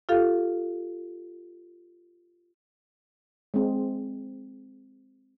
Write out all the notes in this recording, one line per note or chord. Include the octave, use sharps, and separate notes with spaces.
F4 G4 A4 F5
G#3 C4